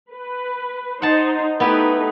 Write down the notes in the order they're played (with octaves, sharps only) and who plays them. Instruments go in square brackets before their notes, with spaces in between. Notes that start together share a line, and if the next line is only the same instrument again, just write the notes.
[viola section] B4
[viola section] D#4 C5 [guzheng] F#5 A5
[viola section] A3 D#4 B4 [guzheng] B3 E4 G4